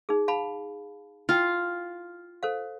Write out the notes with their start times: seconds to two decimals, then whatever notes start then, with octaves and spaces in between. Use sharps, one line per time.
0.09 D#4 G#4
0.28 F5 A5 B5
1.29 E4 F4 G5
2.43 A4 C5 F5